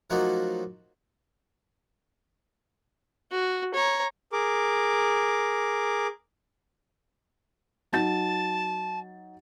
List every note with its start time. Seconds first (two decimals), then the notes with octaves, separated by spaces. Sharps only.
0.10 F3 F#3 A3 A#3 D#4 F#4
3.31 F#4
3.74 C#5 A#5
4.32 G#4 A#4 D6
7.92 F#3 D#4 A5 A6